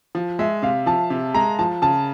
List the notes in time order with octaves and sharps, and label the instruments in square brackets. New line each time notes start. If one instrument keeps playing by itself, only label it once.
[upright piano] F3
[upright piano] G#3 [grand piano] E5
[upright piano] C3 [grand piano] F5
[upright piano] F3 [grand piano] A5
[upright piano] C3
[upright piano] G#3 [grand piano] A#5
[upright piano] F3 [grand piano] A5
[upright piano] C#3 [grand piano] A5